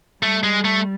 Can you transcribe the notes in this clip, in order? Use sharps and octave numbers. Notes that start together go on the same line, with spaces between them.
G3 A3
G#3
A3